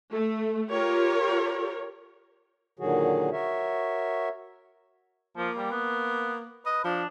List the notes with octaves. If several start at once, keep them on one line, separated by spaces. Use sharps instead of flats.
A3
F4 G4 A#4 C#5
A#2 D3 D#3 F#3 F#4 G#4
F#4 A#4 C#5 E5
F3 A#3
G3
B3
B4 D#5
F3 D4